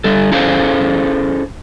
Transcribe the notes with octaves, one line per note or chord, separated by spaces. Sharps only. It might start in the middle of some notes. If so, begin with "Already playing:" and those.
D3 G3 A4
C#4 E4 G#4 A4 C5 F5